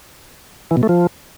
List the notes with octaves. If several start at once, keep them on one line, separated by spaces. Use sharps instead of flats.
E3
B2
A3
F3